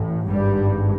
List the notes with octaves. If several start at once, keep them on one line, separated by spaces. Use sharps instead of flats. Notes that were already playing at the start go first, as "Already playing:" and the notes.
Already playing: A1 A2
G#1 G2 G3